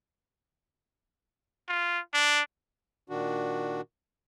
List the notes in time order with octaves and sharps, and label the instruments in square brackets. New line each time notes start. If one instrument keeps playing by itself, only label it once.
[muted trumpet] F4
D4
[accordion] A#2 D#3 D4 F#4